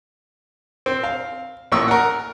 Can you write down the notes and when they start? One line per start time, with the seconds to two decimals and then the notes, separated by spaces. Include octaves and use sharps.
0.86 C4
1.04 F5
1.72 A1 A#2 C#6 D#6 E6
1.88 A#4 F#5